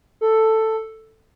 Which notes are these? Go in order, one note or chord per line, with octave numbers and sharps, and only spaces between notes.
A4